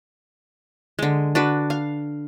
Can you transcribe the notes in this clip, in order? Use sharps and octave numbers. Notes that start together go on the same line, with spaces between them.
D3 G#3
D4 F#4 B4
F5